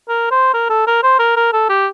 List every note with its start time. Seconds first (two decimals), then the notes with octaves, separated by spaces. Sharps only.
0.09 A#4
0.31 C5
0.54 A#4
0.70 A4
0.87 A#4
1.03 C5
1.19 A#4
1.36 A#4
1.53 A4
1.69 G4